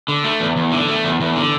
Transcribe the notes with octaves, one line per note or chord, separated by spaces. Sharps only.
D3
A3
E2
E2
D3
A3
E2
E2
D3